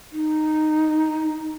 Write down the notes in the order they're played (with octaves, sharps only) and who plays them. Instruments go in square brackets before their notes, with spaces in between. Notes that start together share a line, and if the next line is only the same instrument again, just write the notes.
[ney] D#4